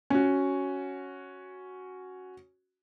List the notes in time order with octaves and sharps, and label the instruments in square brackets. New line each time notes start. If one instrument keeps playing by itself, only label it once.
[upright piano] C#4 F#4